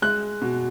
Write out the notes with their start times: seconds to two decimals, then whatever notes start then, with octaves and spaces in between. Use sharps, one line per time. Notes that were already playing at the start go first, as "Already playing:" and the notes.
0.02 G#3 F#6
0.42 B2